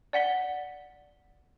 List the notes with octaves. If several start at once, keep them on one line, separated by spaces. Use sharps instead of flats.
D5 F#5 B6 G7